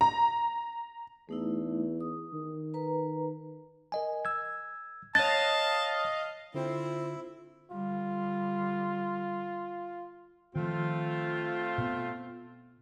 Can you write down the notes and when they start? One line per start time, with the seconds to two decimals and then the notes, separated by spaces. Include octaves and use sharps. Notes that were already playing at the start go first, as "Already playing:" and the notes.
0.01 A#5
1.29 E2 A3 D#4 E4
2.01 D#6
2.33 D#3
2.74 B4 A#5
3.92 A#4 D#5 G#5
4.25 E6 G#6
5.15 C#5 D#5 F5 A5 F#6 A6
6.55 D3 C4 E4 F4
7.71 D3 G3 F4
10.55 D#3 F3 A3 C4 F4
11.78 B2 B3